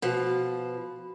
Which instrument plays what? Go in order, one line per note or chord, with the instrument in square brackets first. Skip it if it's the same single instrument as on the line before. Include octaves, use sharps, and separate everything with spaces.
[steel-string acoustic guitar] B2 F3